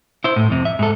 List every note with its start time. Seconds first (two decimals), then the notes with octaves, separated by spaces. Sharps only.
0.24 E4 C5
0.36 A2
0.50 F2 C3
0.65 E5
0.79 G#2 A4